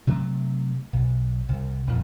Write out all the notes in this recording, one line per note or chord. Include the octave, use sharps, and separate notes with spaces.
C3 F#3 A3
B1
C2
D#1 F2 A#2